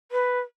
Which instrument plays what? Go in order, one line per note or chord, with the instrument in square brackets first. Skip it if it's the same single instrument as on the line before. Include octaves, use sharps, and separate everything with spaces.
[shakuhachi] B4